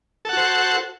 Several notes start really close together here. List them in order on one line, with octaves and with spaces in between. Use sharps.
A4 F#5 F#4 C5